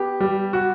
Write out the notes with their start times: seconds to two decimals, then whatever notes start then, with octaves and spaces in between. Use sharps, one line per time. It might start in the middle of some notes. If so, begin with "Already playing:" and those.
Already playing: B3 G4
0.20 G3
0.53 F#4